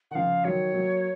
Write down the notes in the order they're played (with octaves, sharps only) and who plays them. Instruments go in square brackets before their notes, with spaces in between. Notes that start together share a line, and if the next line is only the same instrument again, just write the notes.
[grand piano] D#3 [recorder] F#5
[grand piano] C#3 F3 [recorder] F5
[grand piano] D#3 F#3 [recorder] C#5
[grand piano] F#3 A#3